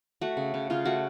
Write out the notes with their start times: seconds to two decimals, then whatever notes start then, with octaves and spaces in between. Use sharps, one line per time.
0.21 A3 F#4
0.37 C#3
0.54 C#3
0.70 C#3 F4
0.85 A3 F#4